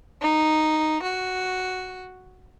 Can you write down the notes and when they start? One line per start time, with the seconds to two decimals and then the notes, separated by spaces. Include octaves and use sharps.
0.21 D#4
1.02 F#4